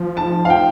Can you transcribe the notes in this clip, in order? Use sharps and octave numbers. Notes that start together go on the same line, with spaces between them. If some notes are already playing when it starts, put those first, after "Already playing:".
Already playing: F3
A5
F5
G5